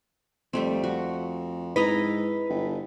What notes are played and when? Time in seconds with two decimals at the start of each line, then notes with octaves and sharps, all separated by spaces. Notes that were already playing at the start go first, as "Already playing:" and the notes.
0.53 F2 G3 A3 C4
0.84 F#4
1.76 G#2 E4 B4 D#5 A#5
2.49 G1